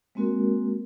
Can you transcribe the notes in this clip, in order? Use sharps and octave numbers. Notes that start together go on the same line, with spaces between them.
G#3 A#3 C4 F#4 A#4